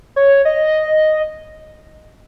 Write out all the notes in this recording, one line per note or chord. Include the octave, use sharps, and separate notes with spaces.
C#5
D#5